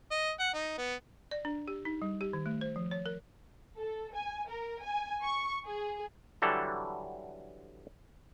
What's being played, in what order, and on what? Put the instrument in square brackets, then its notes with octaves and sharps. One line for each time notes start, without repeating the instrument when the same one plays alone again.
[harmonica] D#5
F#5
D#4
B3
[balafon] D5
D4
G4
D#4
G3
G4
D#3
A3
C5
F3
C#5
A#4
[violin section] A4
G#5
A#4
G#5
C#6
G#4
[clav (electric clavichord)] D3 E3 F#3 G3 A4